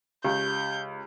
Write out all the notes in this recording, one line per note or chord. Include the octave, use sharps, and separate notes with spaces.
C#2 G4 G6